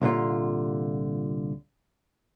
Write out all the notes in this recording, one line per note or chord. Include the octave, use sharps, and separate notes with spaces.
C2 A#2 D3 F4